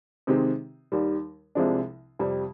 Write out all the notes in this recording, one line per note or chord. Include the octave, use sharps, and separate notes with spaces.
C3 D#3 G#3 C4 G4
D#2 D#3 G3
C2 C3 F3 G#3 D4
F2 C3 G3